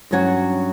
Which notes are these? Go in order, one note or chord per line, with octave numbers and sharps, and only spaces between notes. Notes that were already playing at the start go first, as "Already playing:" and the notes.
G2 F#3 C#4 F#4 C#5